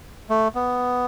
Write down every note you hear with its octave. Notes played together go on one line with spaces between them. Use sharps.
A3
B3